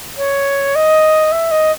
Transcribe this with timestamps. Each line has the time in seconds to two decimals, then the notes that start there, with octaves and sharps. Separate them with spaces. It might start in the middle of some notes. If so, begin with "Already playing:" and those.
0.17 C#5
0.75 D#5
1.32 E5
1.51 D#5